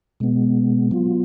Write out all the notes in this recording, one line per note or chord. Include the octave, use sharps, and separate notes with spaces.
B2 G#3 B3
F#3 B3 F4